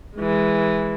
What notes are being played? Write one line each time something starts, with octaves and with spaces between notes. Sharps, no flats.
E3 G#3